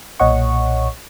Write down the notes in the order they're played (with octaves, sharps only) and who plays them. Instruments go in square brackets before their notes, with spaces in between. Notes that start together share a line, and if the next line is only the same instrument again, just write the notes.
[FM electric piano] B1 A#2 C#5 D#5 F#5 C#6